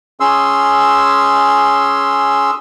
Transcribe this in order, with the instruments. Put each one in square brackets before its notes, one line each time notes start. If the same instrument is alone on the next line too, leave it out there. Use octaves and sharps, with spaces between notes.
[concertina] C#4 G#4 C6 E6